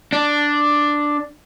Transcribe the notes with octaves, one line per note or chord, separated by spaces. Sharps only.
D4